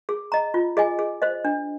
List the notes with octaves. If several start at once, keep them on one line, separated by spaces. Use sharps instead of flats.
G#4
D#5 A#5
F4
G#4 D#5 G#5
G#4
C5 D#5
D4